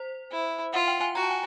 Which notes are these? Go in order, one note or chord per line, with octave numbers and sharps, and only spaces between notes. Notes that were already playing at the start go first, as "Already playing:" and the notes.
Already playing: C5
E4
F4 F#5
G5
G#5
F#4 A#5
A5
G#5